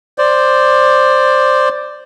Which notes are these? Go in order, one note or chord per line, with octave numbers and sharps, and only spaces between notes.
C5 D5